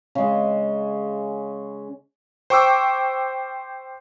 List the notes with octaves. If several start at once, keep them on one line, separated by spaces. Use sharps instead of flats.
C#3 G#3
C5 G5 C#6 D6 E6